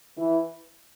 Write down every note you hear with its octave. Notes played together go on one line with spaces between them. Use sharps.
E3 E4